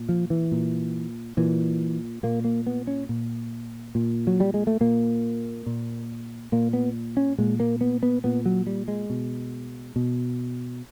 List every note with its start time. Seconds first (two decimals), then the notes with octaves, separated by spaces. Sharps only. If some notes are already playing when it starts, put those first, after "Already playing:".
Already playing: A#2
0.09 F3
0.30 E3
0.52 A#2
1.37 A#2 E3
2.23 A#2 A#3
2.44 A#3
2.67 B3
2.87 C#4
3.09 A#2
3.95 A#2
4.27 F#3
4.40 G3
4.54 G#3
4.67 A3
4.81 A#2 A#3
5.66 A#2
6.52 A#2 A#3
6.73 B3
7.17 C#4
7.38 A#2 G#3
7.60 A#3
7.81 B3
8.03 B3
8.24 A#2 B3
8.46 F#3
8.67 G3
8.88 G#3
9.10 B2
9.96 B2